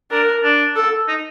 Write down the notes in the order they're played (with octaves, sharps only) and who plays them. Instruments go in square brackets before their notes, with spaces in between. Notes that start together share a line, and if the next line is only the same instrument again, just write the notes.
[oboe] D4 [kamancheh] A#4
[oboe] D4
[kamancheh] A4
[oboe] D#4